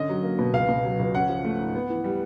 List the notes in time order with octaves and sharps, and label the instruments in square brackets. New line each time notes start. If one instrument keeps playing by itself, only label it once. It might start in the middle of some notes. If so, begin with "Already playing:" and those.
Already playing: [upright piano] D3 C#4 D#5
F#3
A#3
B2
C#2 F5
B2
F#3
C#2
C#4 F#5
F3
A3
G#2
B3
E3
G3